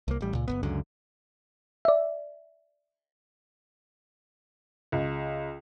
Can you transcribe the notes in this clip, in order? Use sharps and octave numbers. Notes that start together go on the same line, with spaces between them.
C2 A#3
A1 G3
C#2 A#2
F#1 F#2 B3
C#2 F#2 D3
D5 E5
C#2